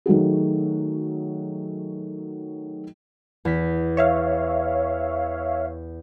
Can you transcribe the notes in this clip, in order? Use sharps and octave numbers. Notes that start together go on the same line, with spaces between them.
D#3 F#3 A3 F#4 G#4
E2 B6
C#5 E5 F5